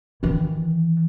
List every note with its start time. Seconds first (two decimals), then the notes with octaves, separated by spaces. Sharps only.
0.23 D#3 E3